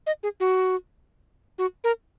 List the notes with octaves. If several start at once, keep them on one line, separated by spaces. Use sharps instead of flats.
D#5
G#4
F#4
F#4
A#4